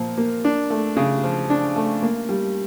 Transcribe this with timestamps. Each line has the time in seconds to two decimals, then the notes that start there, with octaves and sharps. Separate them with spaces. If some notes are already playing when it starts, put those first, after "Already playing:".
Already playing: A#2 F3
0.18 A#3
0.45 D4
0.70 A3
0.97 C#3
1.24 F3
1.50 D4
1.76 A3
2.03 A#3
2.29 G3